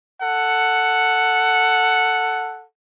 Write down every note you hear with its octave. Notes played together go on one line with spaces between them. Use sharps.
A4 F#5